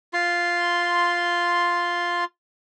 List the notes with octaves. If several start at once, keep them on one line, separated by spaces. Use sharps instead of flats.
F4 C6